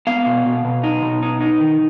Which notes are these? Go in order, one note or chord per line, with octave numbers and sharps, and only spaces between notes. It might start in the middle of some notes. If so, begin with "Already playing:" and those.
B3 F5
B2
B2
B2
D#4
B2
D#4
D#4
D#3